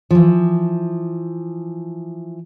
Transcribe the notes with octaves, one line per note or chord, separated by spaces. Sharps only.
E3 F3